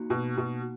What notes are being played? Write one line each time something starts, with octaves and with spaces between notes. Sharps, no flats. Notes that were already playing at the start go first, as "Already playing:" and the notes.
Already playing: A#3 D#4 F#4
B2
B2